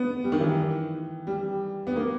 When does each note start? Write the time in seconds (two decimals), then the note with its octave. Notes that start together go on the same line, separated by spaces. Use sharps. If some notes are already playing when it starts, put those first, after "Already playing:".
Already playing: B3
0.24 G3
0.32 D#3
0.40 E3
1.27 G3
1.87 B3
1.96 A#3